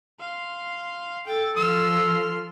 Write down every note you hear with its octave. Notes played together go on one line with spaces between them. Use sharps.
F5 C6
A4 G5 A6
F3 C6 E6 F6